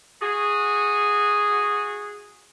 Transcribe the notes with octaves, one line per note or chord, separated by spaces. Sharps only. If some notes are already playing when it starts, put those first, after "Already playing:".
F#4 G#4